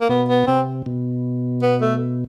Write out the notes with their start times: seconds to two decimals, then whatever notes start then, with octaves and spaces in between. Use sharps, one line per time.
0.01 A#3
0.09 B2 B3
0.29 B3
0.47 C3 C4
0.86 B2
1.63 B3
1.82 A3